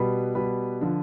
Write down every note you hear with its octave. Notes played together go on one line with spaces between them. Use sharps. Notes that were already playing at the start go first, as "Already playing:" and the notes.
Already playing: B2 G3 B4 B5
B2 G3 B4 B5
D3 F3